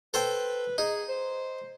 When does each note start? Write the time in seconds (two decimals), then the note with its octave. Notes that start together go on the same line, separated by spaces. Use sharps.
0.14 A4 B4 C5 G5
0.78 D#4 G#4
1.09 C5